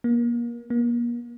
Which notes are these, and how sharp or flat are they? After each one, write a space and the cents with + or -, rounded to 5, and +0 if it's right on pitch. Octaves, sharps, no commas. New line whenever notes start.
A#3 +30
A#3 +35